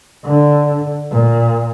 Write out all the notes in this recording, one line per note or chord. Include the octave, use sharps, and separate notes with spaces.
D3
A#2